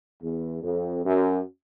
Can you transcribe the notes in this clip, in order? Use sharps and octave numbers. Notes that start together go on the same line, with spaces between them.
E2
F2
F#2